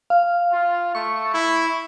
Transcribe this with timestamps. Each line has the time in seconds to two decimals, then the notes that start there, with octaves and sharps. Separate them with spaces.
0.10 F5
0.53 F4
0.95 A3 C#6
1.34 E4